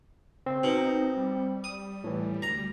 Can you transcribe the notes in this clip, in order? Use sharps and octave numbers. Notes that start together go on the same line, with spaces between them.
C#3 C4
B2 D#4
G3
D#6
A2 E3
D2 A#5